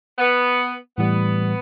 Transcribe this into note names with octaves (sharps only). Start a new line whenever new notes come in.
B3
A2 E3 G3 B3